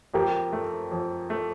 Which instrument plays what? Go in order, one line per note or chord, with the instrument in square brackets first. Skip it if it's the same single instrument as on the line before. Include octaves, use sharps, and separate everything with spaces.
[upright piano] F2 [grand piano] G4 A#4
[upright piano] A3
F2
A3